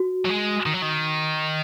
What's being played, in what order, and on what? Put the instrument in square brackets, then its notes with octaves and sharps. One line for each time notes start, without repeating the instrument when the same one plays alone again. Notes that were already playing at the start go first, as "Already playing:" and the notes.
Already playing: [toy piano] F#4
[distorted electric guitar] F#3
G#3
D#3
F#3
D#3